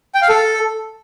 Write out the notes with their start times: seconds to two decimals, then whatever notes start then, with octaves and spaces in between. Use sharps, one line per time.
0.14 G5
0.22 F5
0.29 A4